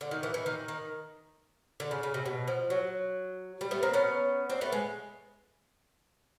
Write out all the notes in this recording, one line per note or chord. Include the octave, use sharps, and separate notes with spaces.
D3
D#3
E3
E3
D#3
D#3
D3
C#3
C#3
C3
B2
F3
F#3
G3
A3 B3
A#3 C4
B3 C#4
C4 D4
A3 B3
G#3